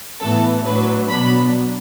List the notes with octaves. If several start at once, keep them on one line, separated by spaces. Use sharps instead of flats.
A2 E3 B3 A4
A2 F#3 D4 B4
B2 F#3 B3 D4 B5